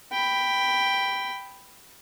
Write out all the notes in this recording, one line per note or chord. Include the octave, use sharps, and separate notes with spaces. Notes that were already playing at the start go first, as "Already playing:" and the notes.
G5 B5